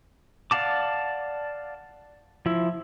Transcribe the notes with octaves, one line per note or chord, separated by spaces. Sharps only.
D5 F5 F#5 A5 D6
F3 E4